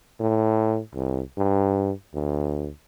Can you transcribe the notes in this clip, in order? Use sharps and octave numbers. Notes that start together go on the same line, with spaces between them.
A2
C2
G2
D2